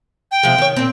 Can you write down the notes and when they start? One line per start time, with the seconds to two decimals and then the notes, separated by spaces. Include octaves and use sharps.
0.31 G5
0.43 C3 F3 G#3
0.58 D#3 C#5
0.76 A#2 C4